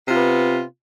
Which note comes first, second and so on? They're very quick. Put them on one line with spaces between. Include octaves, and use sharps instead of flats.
C3 F4 B3